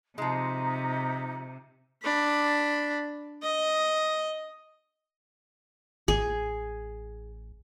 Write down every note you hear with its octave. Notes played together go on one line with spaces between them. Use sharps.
C3 F3 G#3 D#4
D4 B5
D#5
A1 G#4